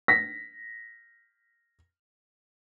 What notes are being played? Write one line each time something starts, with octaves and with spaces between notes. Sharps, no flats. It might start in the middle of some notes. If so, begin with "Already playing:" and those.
A#6 B6